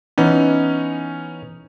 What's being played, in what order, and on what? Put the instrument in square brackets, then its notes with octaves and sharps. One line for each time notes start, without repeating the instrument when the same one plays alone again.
[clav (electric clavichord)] E3 B3 [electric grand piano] C#4 D#4